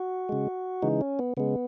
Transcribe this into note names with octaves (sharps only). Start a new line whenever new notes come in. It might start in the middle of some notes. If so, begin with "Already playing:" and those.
Already playing: F#4
C#3 G#3
C#3 E3 G#3 D#4
C#4
B3
C#3 G#3 B3